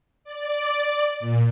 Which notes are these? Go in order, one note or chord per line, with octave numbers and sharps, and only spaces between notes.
D5
A#2